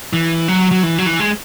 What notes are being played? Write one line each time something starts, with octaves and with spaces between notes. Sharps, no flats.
E3
F#3
F#3
E3
F#3
E3
G#3